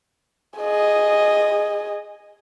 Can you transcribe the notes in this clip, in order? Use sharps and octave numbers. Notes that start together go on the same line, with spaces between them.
G#4 D#5